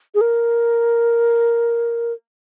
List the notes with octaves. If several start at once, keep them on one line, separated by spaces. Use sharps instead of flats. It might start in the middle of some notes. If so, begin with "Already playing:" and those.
G#4
A#4